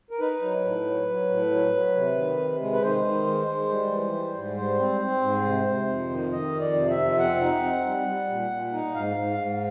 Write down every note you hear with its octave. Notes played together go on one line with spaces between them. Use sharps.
A#4
D#4 B4
F#3
A2
F#3
F#3
A2
F#3
F#3
C3
D#3
C3
G#3
B4
D#3 C5
D#3
G#3
G#3
G3
E3
G3
G#2
G3 C5
C4
C4
G#2
C3
C3
F2
D#3
D#3 D#5
F2
D5
C3
E5
F2
C4 F#5
D#4
C4
G3
G3
A#2
A#2
D#4
G#2 F5
G#2
G#2